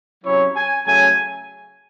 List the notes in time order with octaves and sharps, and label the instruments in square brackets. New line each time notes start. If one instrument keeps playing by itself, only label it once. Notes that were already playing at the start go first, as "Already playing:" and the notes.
[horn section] C3 F#3 C#4 E4 C#5
G#5
C#3 F#3 A3 G#5